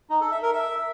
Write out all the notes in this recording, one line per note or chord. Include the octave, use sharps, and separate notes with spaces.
D#4
A4
E5
A#4
E5